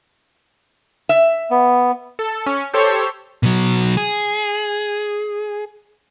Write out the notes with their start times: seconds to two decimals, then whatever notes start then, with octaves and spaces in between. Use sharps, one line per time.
1.09 E5
1.51 B3
2.19 A4
2.46 C#4
2.74 G4 A4 C5 C#5
3.43 B2 F#3
3.97 G#4